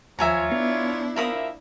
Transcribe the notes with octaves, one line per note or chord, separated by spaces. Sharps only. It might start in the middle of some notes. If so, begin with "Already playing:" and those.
D#2 F3 F4 C#5 E5 G#5 A#5
B3 D4 E4
F3 A#3 A#4 E5 B5 D#6